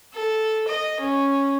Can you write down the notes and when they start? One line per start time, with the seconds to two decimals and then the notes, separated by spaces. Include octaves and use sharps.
0.14 A4
0.68 D#5
1.01 C#4